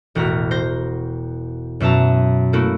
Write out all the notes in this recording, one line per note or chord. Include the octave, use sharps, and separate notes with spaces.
E1 A1 F#4 A#5 F6 B6
C5 A#6
F#2 B2 E5 A5 A#5
A3 A#3 E4 F#4